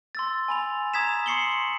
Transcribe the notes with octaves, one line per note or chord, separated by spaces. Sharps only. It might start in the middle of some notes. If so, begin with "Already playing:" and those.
C6 E6 A6
G#5 B5 F7
A#5 D#6 G#6 B6 E7
C6 C#6 C7 C#7 F#7 G7